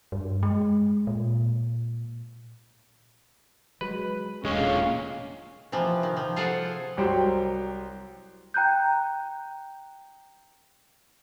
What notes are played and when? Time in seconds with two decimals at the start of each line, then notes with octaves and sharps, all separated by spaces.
0.12 G2
0.43 G#3
1.07 A#2
3.81 F#3 G#3 B4
4.45 E1 A#2 D3 G#3 C#4 F5
5.72 C3 E3 F3
6.03 D#3
6.16 F3
6.36 F4 G#4 A4 C5 F#5
6.97 C2 F#3 G4 C5 G5
8.54 G5 A#5 F#6 G6